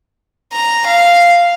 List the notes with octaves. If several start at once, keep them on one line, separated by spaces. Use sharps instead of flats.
A#5
F5